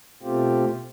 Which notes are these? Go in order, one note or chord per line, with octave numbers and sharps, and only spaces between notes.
B2 A3 C4 F4 G4